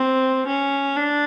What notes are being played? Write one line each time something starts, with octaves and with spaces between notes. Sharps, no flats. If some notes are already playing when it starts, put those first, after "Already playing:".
Already playing: C4
C#4
D4